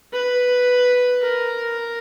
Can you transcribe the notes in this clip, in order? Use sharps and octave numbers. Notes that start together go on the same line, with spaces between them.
B4
A#4